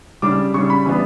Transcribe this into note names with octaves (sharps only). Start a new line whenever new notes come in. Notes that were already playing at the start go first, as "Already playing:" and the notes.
C#3 G3 D4 D6
C#3 G3 D4 C#6
B5
E3 G3 B3 D4